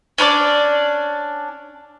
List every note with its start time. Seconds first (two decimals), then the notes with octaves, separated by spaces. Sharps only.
0.18 C#4 D4 C#5 D5